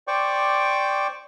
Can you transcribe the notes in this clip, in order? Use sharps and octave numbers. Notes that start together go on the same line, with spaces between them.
C5 D5 G5 C#6 D6